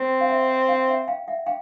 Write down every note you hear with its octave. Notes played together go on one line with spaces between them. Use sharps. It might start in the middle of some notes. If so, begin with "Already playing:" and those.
Already playing: C4 G5
F5
E5 F#5
F5 G5
E5 F#5
F5 G5
E5 F#5
F5 G5